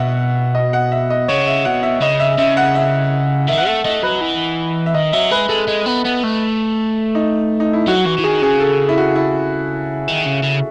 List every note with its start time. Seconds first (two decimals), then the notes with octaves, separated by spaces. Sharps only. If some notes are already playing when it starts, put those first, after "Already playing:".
Already playing: B2 E5 F#5
0.55 D#5
0.73 F#5
0.92 E5
1.10 D#5
1.28 C#3 C#5
1.47 E5
1.65 B2 F#5
1.83 E5
2.01 C#3 D#5
2.20 E5
2.38 C#3 E5
2.57 F#5
2.75 E5
3.48 D#3 E5
3.57 F#5
3.66 A3 E5
3.84 A3 D#5
4.03 F#3 B4
4.21 E3
4.86 E5
4.94 D#3 D#5
5.13 F#3 E5
5.31 G#3 B4
5.49 G#3 A4
5.67 G#3
5.86 B3
6.05 B3
6.23 A3
7.15 D#4
7.60 D#4
7.73 E4
7.87 F#3 F#4
8.05 E3 F#4
8.18 E3
8.24 D#3 G#4
8.42 C#3 G#4
8.60 A4
8.89 E4
8.98 F#4
9.15 E4
10.08 D#3
10.26 C#3
10.43 C#3